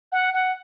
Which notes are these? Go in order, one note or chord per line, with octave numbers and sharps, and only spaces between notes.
F#5
F#5